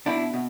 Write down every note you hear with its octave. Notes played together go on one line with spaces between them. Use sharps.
B2 D4 E4
B2